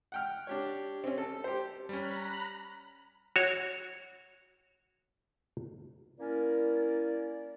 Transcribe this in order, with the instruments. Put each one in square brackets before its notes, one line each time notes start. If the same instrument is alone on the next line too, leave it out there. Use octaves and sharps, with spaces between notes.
[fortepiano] F#5 G5 F6
D4 G4 C#5
C4 C#4
A4
G4 C5
[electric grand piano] G3 C#4 [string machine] A#5 B5 F#6
[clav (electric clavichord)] F#4 C#5
[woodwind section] A#3 C#4 E4 A#4 D5